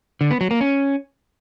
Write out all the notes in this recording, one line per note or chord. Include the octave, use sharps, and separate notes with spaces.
D3
B3
F#3
A#3
C#4